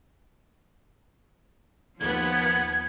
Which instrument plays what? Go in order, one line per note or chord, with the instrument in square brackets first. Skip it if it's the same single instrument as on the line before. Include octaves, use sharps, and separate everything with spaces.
[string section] D#2 F3 B3 [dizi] G#6